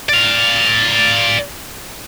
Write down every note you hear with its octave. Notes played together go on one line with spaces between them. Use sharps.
D5 F5